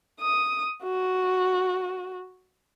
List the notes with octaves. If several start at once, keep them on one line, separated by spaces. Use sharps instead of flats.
D#6
F#4